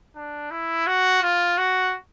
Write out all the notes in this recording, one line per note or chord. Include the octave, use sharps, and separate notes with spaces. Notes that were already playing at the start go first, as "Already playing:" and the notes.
D4
E4
F#4
F4
F#4